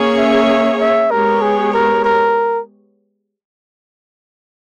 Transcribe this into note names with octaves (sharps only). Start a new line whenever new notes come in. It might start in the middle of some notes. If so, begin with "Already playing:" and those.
Already playing: A#3 C#4 G#4 C#5
E5
E5
G#3 B3 G4 A#4 C#5
G#4
A#4
A#4